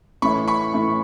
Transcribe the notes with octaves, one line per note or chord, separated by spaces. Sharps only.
A2 E3 A3 C#4 E4 B5 C#6
B5 C#6
A2 E3 A3 C#4 E4